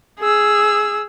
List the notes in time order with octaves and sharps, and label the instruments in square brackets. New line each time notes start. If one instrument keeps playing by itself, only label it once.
[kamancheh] G#4 E6